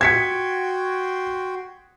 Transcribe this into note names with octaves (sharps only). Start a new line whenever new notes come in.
F#4 G5 C6 G#6 B6 C#7